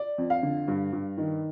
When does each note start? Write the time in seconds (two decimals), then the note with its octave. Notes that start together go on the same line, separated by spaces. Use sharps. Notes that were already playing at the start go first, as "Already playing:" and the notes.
Already playing: D5
0.18 F2
0.30 F5
0.43 D3
0.68 G2
0.93 G2
1.18 D#3